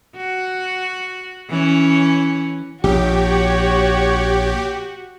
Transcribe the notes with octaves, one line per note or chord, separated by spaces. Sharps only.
F#4
E3 C#4
A#1 F#4 G4 C#5